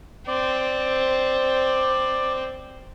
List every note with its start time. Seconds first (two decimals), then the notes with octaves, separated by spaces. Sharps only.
0.27 C4 D5